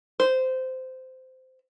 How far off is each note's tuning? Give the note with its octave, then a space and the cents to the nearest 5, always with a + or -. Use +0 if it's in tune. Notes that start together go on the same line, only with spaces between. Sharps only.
C5 -15